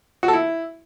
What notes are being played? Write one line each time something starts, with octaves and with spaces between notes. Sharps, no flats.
F#4
A4
E4